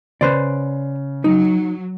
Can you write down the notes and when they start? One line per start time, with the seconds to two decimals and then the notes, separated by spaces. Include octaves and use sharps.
0.21 C#3 B4 C5 D5
1.24 F#3 D#4